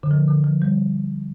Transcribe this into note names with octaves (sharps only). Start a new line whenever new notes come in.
D3
F3
D3
F3
G3